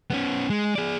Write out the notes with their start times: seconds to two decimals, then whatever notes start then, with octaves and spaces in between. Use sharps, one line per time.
0.10 B3 C#4
0.50 G#3
0.75 G#4 D5